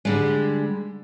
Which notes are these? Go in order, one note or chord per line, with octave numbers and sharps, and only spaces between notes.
D3 G3 G#3